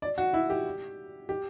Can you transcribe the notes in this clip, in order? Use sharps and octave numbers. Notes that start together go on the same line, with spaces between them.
D5
F#4
E4
G4
G4